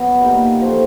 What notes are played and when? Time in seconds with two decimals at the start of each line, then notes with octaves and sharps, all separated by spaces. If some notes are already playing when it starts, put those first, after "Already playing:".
Already playing: B2 F#3 B3
0.20 A#2 G3 A#3 D#4
0.60 A#2 F3 A3 C4